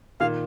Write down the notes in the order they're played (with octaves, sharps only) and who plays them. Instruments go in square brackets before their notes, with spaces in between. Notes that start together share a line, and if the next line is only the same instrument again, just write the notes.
[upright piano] A#2 D#3 [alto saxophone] F5